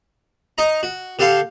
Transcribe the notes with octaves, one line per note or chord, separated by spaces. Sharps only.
D#4 D#5 A#5
F#4
D3 G4 A4 F5 C6